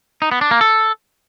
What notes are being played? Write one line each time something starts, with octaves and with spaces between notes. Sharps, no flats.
D#4
B3
D4
A#3
A4